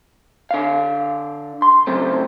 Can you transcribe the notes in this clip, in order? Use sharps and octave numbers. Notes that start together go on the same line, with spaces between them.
D3 F5
C6
C#3 F#3 A3 C4